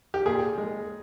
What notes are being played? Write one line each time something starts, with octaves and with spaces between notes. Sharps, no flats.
G4
A#2 G#4
G#3